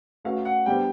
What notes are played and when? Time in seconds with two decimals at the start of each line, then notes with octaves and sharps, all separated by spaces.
0.25 A3 C#4 F#4 B4 F5
0.45 F#5
0.66 G3 B3 D4 G4 C5 G5